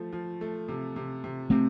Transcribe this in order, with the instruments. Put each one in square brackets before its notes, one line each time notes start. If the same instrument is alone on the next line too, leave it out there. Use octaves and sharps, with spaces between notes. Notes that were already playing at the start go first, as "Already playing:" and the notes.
Already playing: [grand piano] F3 A3
F3
A3
C3
C3
C3
[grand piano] C3 [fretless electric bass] A3 C4